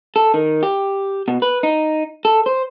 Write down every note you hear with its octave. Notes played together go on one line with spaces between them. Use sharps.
A4
D#3
G4
B2
B4
D#4
A4
C5